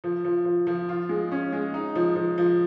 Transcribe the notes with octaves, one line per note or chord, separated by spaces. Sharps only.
F3
F3
F3
F3
F4
G#3
C#4
G#3
D#4
F3
F3
F3